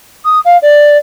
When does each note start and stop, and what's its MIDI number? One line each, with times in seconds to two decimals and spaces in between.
0.25 0.39 87
0.45 0.57 77
0.62 0.97 74